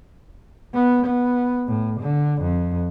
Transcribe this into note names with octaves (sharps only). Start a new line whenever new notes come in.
B3
B3
A2
D3
F2